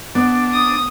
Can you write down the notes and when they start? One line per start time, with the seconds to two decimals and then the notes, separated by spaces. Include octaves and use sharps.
0.15 B3 D4
0.52 D#6